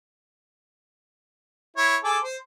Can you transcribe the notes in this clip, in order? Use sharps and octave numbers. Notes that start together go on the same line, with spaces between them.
E4 C#5
G#4 A4 D6
C5